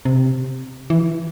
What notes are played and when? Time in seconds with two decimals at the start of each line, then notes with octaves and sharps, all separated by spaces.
0.05 C3
0.90 E3